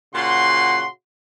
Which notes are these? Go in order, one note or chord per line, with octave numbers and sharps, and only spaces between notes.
A#2 C#3 F#4 F#5 C6